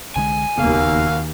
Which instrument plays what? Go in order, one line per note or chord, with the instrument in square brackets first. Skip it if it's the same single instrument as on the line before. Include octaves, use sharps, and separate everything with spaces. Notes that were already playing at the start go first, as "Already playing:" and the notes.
[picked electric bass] C2 D3 G#3 [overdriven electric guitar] G#5
[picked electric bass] E1 C#3 B3 [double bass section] D#2 A#3 [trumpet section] F#4 F5